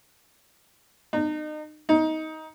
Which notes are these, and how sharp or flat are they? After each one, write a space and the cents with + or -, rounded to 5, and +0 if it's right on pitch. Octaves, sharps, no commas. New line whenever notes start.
D#4 -35
D#4 +20